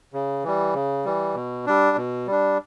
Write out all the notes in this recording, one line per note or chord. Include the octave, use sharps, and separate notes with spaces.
C#3
E3 G3
C#3
E3 G3
B2
G3 D4
B2
G3 D4